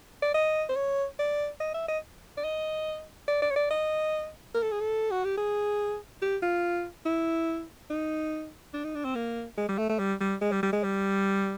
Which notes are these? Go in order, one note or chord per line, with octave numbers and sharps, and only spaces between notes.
D5
D#5
C5
C#5
D5
D#5
E5
D#5
D5
D#5
D5
D5
C#5
D5
D#5
A#4
A4
G#4
A4
F#4
G4
G#4
G4
F4
E4
D#4
D4
D#4
D4
C4
A#3
G#3
G3
A3
A3
G3
G3
G#3
G3
G3
G#3
G3